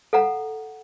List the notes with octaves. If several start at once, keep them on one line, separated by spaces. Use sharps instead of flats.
A4 F5 F#5 A#5